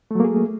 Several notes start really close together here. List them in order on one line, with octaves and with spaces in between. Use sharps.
A3 F#3 A#3 G#4